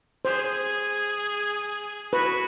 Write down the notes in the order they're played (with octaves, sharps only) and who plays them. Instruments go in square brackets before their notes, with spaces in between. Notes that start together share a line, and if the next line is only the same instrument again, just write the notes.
[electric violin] G#4 [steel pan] C5
[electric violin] F#4 [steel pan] B4